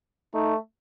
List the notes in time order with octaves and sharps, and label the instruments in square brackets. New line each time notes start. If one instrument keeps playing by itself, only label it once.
[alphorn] A3 [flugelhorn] D#4